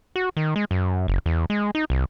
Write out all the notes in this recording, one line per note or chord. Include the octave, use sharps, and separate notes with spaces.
F#4
D#3
G#3
F#2
F#1
E2
G#3
D#4
C2